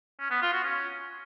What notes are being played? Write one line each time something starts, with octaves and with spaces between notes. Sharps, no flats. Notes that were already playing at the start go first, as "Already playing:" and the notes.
C#4
B3
F4
F#4
C#4